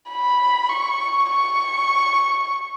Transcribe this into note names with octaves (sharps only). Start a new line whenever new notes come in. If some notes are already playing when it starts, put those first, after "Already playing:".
B5
C#6
C#6